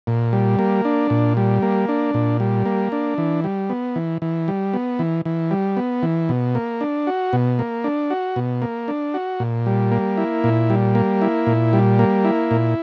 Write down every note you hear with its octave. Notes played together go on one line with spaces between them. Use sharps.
A#2
G3
A#3
D4
A#2
G3
A#3
D4
A#2
G3
A#3
D4
E3
G3
B3
E3
E3
G3
B3
E3
E3
G3
B3
E3
B2
A#3
D4
F#4
B2
A#3
D4
F#4
B2
A#3
D4
F#4
A#2
G3
A#3
E4
A#2
G3
A#3
E4
A#2
G3
A#3
E4
A#2